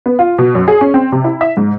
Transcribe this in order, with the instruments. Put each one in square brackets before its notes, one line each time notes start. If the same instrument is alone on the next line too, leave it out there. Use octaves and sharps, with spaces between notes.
[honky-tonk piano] B3
F4
B2
F#2
G#4
C#4
C4
C3
E4
E5
G#2